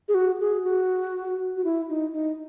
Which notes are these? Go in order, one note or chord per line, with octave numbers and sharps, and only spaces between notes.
G#4
F#4
G#4
F#4
F#4
E4
D#4
D#4